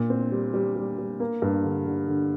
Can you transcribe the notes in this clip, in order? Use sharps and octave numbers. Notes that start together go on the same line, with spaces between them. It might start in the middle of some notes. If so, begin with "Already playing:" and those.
Already playing: A#2
C4
G3
G3
G3
G3
A#3
G2
D3
D3
D3